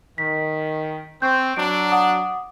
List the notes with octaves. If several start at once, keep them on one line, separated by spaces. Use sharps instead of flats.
D#3 B6
C4 C#6 G6
F#3 D4 D7
F#5 D6 D#6